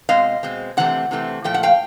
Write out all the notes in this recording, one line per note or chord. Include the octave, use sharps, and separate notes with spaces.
B2 G#3 C4 D#5 F5
B2 G#3 C4
C3 E3 A3 C4 F#5
C3 E3 A3 C4
A#2 F3 A3 G5
F#5
F5 G5